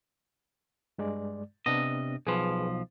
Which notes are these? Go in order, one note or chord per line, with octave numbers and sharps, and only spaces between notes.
G2 G#3 D5
C3 B3 C4 D4 D#5
B1 F3 G#4 B4